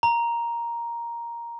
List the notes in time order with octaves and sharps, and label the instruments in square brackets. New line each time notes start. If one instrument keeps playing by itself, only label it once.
[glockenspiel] A#5